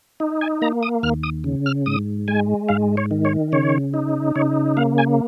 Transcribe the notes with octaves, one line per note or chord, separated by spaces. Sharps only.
D#4
G#5
A#3 A#5
D#6
D#2 F6
D#6
C#3
F6
G#2 D#6
G#3 G#5
G#2 F5
C#5
D#3
C#5
C#3 C#5
D#4
C#3 C#5
A#3 F5
G#5